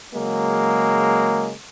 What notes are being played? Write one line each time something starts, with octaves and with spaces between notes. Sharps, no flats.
C#3 F#3 G#3 A#3